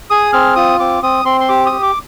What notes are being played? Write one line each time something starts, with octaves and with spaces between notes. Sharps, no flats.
G#4 D#6
C4 F6
F4 D#6
C4 D6
C4 D#6
C4 C6
C6
G4 D6
D#6
G4
D6